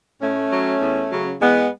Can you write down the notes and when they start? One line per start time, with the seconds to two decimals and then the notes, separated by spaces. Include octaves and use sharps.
0.22 A2 A3 C#4
0.52 F#3
0.82 E2
1.11 C#3 F#3
1.41 E2 G#3 B3